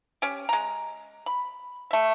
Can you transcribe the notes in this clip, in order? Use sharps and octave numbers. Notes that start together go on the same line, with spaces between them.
C#4 G4
G#3 A#5
B5
A3 E5